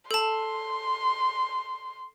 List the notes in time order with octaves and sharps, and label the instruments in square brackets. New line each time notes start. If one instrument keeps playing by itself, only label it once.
[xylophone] A4 A5 [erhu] C6